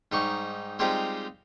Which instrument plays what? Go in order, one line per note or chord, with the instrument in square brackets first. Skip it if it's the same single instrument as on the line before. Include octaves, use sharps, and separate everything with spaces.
[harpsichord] G#2 G3 D#4 C#6
G3 G#3 C4 D#4 F4 G4